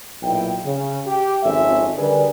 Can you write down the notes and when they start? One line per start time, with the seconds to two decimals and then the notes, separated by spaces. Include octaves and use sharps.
0.22 B1 A#2 E4 G5
0.64 C#3
1.06 G4
1.44 G#1 F2 G#3 C#4 A4 E5
1.96 D3 G3 G#4 A#4 B4 D5